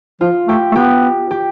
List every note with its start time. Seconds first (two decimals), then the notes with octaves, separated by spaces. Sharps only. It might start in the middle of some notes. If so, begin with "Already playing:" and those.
0.21 F3 F4
0.48 A3 G4
0.72 A3
0.75 B3 G4
1.31 G4